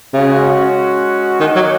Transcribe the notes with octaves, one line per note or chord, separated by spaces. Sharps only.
C#3 G#3 C#4 F#4
D#3 A#3 D#4 G#4 D#5 F#5
F#3